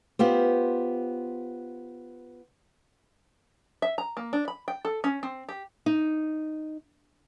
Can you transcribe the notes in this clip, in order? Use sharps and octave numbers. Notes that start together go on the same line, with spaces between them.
B3 F4 G4 C5
E5
A#5
A#3
D4
B5
G5
A4
C#4
C4
G4
D#4